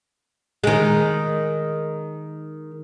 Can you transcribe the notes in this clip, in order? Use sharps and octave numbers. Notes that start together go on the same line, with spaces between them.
D#3 G#3